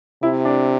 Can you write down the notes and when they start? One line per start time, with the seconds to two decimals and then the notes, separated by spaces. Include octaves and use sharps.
0.23 C3 E4
0.45 D4